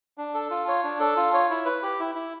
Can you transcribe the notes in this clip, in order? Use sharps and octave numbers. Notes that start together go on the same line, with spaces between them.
D4
A4
F4
C#5
D4
A4
F4
C#5
E4
B4
G4
E4
E4